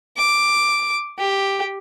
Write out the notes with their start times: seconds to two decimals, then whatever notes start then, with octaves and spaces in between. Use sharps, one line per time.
0.18 D6
1.18 G4